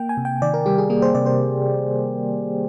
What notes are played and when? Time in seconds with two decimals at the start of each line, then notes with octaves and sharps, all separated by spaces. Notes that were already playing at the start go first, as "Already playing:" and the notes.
Already playing: A#3 G5
0.09 G#5
0.17 C3
0.25 G5
0.42 D#3 D5
0.54 A#4
0.66 G3 G4
0.78 G#4
0.90 A#3 G#4
1.02 C5
1.15 C3 D5
1.26 C5